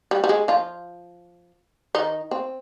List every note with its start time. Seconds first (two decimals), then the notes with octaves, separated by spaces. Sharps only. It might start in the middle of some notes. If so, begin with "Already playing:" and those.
0.11 G3
0.24 G3
0.29 G#3
0.48 F3 F4
1.95 D#3 D#4
2.31 C4